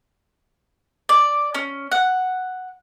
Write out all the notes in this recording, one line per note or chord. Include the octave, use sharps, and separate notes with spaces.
D5
C#4
F#5